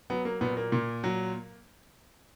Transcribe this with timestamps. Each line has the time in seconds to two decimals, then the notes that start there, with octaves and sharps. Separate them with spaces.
0.10 F#3 B3
0.25 A#3
0.41 A#2 B3
0.57 A#3
0.72 A#2
1.04 F#3